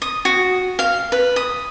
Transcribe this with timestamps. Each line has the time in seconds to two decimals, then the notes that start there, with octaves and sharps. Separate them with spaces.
0.02 D#6
0.25 F#4
0.79 F5
1.12 B4
1.36 D#6